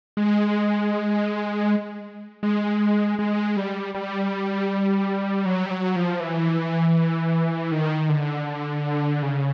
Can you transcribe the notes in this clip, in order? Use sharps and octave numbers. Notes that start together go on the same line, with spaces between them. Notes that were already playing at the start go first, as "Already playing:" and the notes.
G#3
G#3
G#3
G3
G3
F#3
G3
F#3
F3
E3
D#3
D3
C#3